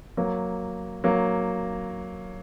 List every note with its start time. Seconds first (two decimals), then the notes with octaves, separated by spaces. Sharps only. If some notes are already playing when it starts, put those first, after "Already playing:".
0.17 F#3 A#3
1.04 F#3 A#3